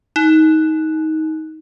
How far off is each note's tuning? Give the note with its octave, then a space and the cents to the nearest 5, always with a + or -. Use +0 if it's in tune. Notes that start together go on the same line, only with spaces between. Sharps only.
D#4 +20